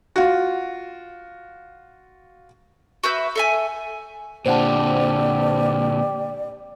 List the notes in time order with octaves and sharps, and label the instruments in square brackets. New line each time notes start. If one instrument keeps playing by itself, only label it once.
[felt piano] F4 F#4
[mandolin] F#4 B4 E5 G6
A4 E5 G#5
[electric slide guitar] A#2 D3 [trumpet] G4 [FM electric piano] C5 F#5 A5 [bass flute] D5